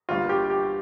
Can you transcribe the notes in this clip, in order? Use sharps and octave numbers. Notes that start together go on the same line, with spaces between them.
G1 G2 G3 A#3 F4
G4
G4